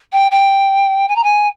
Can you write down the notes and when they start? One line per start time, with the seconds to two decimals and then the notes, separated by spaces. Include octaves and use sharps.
0.12 G5
0.31 G5
1.08 G#5
1.15 A#5
1.23 G#5